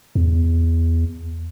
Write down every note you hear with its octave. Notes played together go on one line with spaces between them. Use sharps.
E2